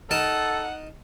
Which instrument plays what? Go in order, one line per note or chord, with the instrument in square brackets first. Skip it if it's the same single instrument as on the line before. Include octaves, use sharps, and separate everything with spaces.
[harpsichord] D#4 A#4 A5 [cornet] A4 [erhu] F#5